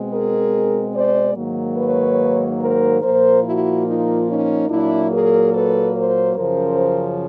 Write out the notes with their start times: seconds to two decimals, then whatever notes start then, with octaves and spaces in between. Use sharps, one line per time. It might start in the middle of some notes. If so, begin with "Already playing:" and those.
Already playing: B2 G#3 C4
0.10 G#4 A#4
0.94 C5 D5
1.35 G#2 D#3 F#3 A#3
1.77 B4 C#5
2.60 A#4 C5
3.02 A#2 F3 A#3 A#4 C5
3.44 E4 F#4
3.85 D#4 F4
4.27 C#4 D#4
4.69 A#2 F#3 A#3 D4 E4
5.11 G#4 A#4
5.52 A4 B4
5.94 A#4 C5
6.36 F#2 C#3 F3 A#4 C5